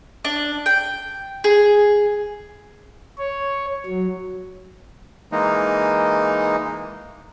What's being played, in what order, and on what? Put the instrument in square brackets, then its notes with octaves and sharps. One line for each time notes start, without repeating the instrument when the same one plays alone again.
[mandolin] D4
G5
G#4
[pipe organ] C#5
F#3
[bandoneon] E3 G#3 A#3 D#4